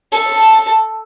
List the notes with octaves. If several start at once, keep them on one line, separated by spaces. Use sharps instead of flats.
A4 A5